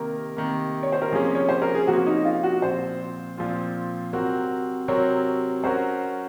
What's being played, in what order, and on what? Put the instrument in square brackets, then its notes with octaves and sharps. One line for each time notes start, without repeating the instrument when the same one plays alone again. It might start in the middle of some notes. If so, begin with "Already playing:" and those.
Already playing: [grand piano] C3 D#3 A#3 [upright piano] A#4
[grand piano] C3 D#3 A#3
[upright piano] C#5
C5
A#4
[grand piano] C3 F3 A#3 C#4 [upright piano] G#4
[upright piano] C#5
C5
A#4
G#4
[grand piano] C3 F3 A#3 C#4 [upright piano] F#4
[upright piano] D#4
F4
F#4
[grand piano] A#2 F3 C4 F4 [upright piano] C5
[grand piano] A#2 F3 C4 F4
C3 F#3 C4 F#4 A#4
[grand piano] C3 F#3 C4 F#4 A#4 [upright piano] C#5
[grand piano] F#3 C#4 F#4 A#4 [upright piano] C5